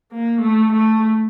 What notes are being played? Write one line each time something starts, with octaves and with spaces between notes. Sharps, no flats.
A#3
A3
A3